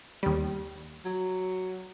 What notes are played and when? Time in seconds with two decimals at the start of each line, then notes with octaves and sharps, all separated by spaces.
0.23 D#2 G3
1.05 F#3